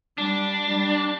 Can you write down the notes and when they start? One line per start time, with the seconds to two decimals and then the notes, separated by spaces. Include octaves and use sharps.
0.18 G3 D4
0.66 G3